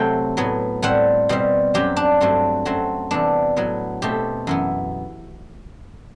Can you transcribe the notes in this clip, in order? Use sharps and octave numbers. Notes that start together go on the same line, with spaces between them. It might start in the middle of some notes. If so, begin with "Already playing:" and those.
Already playing: C3 F#3 A3 G5
A2 F#3 B3
A2 G3 C4 F#5
B2 G3 C4
F#2 F#3 C4 G4
D4
G2 F#3 A3 C4
F#2 F#3 A3 C4
E2 C3 G3 B3 D4
A2 F#3 B3
B2 A3 C4 G4
F#2 E3 B3